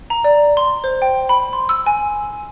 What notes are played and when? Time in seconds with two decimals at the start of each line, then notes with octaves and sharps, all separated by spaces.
0.10 A#5
0.24 D5
0.57 C6
0.84 C5
1.02 G5
1.29 B5
1.53 C6
1.69 E6
1.86 G#5